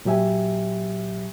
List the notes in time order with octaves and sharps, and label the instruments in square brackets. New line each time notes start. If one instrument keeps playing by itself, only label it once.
[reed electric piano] A#2 F#3 G4 E5 G#5